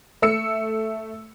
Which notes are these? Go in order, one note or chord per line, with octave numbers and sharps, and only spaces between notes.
A3 E6 C#7